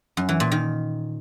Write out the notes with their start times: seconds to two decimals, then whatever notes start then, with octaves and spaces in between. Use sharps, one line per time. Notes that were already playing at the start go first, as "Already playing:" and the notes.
0.17 F#2
0.29 E3
0.40 A#2
0.52 D#3